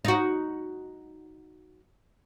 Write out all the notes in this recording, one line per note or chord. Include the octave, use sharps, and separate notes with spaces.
D#4 F#4